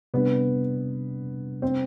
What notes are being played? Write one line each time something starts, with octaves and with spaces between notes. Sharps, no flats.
C3 G3 B3 D4
C4